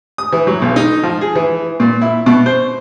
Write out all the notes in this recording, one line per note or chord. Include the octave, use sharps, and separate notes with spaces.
D#6
E3
F#3
B1
D#4
F3
G#4
E3
A#2
E4
B2
C5